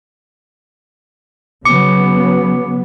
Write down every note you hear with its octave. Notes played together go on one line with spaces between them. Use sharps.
C#3 F#3 B3 D6 C#7